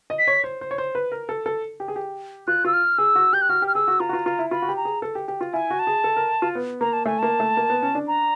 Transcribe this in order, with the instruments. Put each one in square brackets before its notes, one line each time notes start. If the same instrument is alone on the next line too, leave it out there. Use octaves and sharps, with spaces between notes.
[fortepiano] D#5
[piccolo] B6
[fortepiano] C#5
C5
C5
C#5
C5
B4
A#4
A4
A4
G4
G#4
G4
[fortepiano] F4 [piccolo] F#6
[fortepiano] F4 [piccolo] E6
[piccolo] F6
[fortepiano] G#4 [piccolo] E6
[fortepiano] F#4
[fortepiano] G4 [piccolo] G6
[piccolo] F#6
[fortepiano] F#4 [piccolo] F6
[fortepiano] G4
[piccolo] F6
[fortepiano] G#4 [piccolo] E6
[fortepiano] F#4
[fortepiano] F4 [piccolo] A#5
[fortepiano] F#4
F4
F4
E4
[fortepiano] F4 [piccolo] B5
[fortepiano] F#4
G4
[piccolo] A#5
[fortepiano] G#4
A4
G4
G4
F4
[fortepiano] E4 [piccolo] G#5
[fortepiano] F#4
[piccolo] A5
[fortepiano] G#4
A4
A#4
F4
B3
[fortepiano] A#3 [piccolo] A#5
[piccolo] A5
[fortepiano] A3 [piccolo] G#5
[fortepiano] A#3 [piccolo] A5
[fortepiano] A3
A#3
B3
C#4
D4
[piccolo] A#5